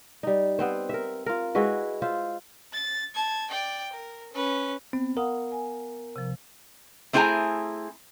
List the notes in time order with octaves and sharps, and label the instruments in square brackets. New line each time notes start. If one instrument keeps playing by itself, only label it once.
[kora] G3 D#4
B3 C4 C5
A#4 E5
F4 A#4
G#3 E4 F#4 B4
F4 C5 E5
[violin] A6
A5 G#6
D5 G5
A#4
C#4 B4
[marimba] B3 [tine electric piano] C4
[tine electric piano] A#4 [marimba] F5 F#5 D#6
[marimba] G#5
C3 F3
[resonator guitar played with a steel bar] A3 C4 E4 G#4 G#5 A#5